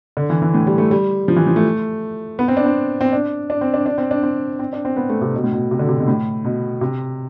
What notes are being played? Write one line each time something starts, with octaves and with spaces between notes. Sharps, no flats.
D3
E3
E3
A2
G3
A3
G3
F3
E3
F3
A3
B3
C4
D4
C4
C4
D4
D4
C4
D4
D4
C4
D4
C4
C4
D4
C4
B3
A3
C3
B2
A2
B2
C3
D3
C3
B2
A2
B2
C3